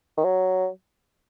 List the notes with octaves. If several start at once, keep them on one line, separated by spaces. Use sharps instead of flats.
D#3
F#3